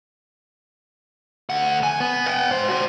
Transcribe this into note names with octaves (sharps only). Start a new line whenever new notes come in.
D2 F#5
G#5
B3
F#5 G5
G#2 C5
F#4 C5